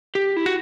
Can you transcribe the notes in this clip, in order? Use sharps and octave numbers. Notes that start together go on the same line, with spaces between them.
G4
E4
F#4